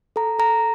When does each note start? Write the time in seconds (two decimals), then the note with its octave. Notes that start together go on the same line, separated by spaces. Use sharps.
0.16 A4 A#5
0.39 A4 A#5